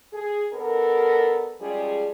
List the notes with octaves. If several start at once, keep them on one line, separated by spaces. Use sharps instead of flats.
G#4
B3 D4 A4 A#4
F3 G3 G#3 C#4 G#4